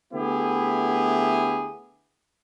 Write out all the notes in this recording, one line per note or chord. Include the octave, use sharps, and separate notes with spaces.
D3 A3 B3 E4 G4 G#4